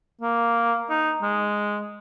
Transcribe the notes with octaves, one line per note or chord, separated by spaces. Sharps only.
A#3
D#4
G#3